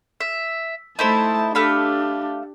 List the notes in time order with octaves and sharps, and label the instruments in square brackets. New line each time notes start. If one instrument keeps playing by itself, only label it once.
[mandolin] E5
[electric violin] A3 A5 [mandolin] D#4 E4 C5
[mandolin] A3 F5 B5 [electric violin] D4 G4